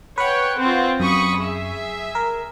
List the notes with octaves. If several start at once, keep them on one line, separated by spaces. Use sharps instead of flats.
B4 C#5 F#5 G5
C4 F4
F#2 B5 C#6 D#6
G#4 E5
A#4